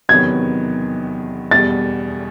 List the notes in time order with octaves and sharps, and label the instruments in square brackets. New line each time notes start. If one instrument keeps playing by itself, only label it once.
[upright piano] E2 C3 D#3 F#3 B3 [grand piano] G#6
[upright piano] E2 B2 G3 [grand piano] A6